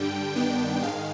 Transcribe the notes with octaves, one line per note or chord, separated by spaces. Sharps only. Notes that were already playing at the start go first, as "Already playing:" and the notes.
Already playing: G2 D3 G3 G5
G2 D#3 B3 D4 G5
G#2 D#3 G#3 F5